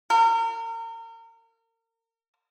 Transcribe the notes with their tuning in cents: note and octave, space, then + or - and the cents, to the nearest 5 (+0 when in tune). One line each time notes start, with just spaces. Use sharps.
A#4 -35